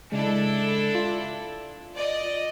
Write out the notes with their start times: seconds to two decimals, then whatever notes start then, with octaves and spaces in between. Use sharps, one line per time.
0.12 C#3 G#3 D4 E4 A4
0.95 F4
1.95 D5 D#5